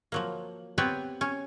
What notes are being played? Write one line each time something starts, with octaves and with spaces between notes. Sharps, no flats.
F3 F#3 A#3
B3 C4 G4 B4 C#5
C#4